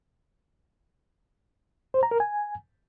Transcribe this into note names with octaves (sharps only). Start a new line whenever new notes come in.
C5
A#5
A#4
G#5